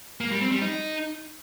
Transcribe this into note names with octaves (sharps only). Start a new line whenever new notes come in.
A#3
G3
C4
G3
D#4